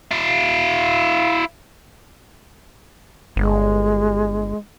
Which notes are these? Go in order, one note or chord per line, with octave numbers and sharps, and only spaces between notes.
E4 F5
G1 G#3